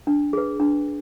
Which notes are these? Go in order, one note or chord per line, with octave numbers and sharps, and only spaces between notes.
D4
G#4 B4
D4